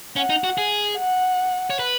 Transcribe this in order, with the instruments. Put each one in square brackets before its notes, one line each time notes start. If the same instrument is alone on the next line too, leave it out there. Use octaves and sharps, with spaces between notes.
[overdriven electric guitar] C#4 [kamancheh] F#5
[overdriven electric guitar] D#4
F#4
G#4
[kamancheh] F#5
[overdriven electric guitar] C#5
B4